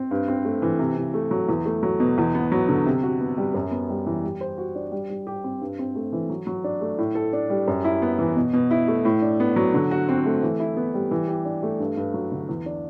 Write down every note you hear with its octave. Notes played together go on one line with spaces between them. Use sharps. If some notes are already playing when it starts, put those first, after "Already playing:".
Already playing: C4
G2
C4
A3
E3
C3
C3
A3
F#3
E2
A3
F#3
B2
E2
B3
F#3
D3
C3
F#4
B3
G3
F#2
B3
G3
E3
G3
C5
F#4
D4
G3
G3
G4
C4
G2
C4
A3
E3
F#3
F#3
D4
A3
A2
A4
D4
G3
F#2
E4
B3
E3
B2
B2
E4
A3
A2
D4
B3
F#3
D3
F#4
C4
A3
E3
E4
B3
G3
E3
G4
D4
A3
G2
G2
F#3
D3
E2
D4